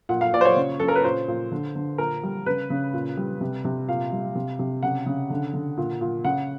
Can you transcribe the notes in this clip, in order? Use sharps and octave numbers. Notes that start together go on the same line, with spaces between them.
A#2 F#5
F5
A#2 D5
C5
C#5
C#3
C#3 A4
A#4
B4
A#2 C5
A#2
D3
D3
A#2 A#4
G3
C#3 B4
C#3
A#2
G3
C3
C3
A#2 F5
G3
C3
C3
C#3 F#5
C#3
D3
D3
A#2
A#2
C#3 F#5